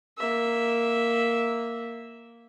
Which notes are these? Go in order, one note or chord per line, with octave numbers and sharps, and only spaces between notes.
A#3 E5